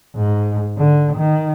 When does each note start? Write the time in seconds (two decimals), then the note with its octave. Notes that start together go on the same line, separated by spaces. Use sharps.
0.16 G#2
0.78 D3
1.17 D#3